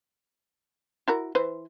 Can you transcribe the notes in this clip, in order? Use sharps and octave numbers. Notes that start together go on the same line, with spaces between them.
E4 F#4 A#4
E3 B4 C5